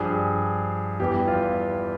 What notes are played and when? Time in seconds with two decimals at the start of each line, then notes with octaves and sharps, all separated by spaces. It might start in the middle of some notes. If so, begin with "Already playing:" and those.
Already playing: G2 F3 G#4
1.00 E2 E3 G3 G4
1.28 F4